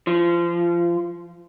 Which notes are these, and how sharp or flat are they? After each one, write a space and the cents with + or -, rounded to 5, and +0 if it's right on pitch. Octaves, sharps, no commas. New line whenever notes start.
F3 -25